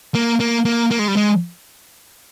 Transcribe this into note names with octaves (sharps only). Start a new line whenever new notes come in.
A#3
A#3
A#3
A#3
G#3
G3
G#3